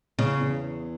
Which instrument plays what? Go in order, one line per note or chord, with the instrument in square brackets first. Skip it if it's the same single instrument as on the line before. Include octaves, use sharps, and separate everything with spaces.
[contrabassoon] E2 [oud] C#3
[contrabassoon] E2